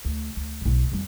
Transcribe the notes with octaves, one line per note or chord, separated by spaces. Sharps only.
D2
D2
B1 B2
F2 G3